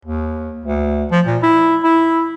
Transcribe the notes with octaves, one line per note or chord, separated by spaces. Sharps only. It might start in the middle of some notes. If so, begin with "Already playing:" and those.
D#2
D2
F3
A#2
E4
E4